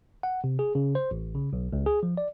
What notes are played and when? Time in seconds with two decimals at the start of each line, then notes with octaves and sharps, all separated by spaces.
0.23 F#5
0.44 C3
0.59 G#4
0.75 C#3
0.95 C5
1.11 A1
1.35 C#3
1.53 B1
1.73 C#2
1.86 G#4
2.03 F3
2.17 D5